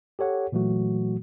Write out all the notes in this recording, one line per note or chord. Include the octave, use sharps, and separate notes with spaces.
G4 A4 C#5 F#5
A#2 E3 F#3 A3 F#4